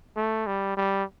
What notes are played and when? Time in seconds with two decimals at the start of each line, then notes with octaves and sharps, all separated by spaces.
0.16 A3
0.47 G3
0.77 G3